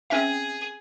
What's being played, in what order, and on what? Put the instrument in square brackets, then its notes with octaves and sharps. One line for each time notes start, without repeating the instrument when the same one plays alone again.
[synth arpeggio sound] C4 C#4 E5 [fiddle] G#4